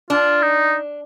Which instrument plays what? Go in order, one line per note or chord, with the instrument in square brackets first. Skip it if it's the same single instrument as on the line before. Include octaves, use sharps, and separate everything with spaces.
[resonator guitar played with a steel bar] D4 [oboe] F4
[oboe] D#4